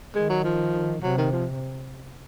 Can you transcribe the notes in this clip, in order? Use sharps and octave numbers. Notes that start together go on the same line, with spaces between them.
D#3 G#3
F#3
F3
C3 F#3
D#3
F3